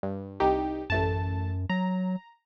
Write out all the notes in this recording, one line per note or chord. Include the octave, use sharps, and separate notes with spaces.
G2
C2 D#4 G4
A1 F#2 A3 A5
F#3 A#5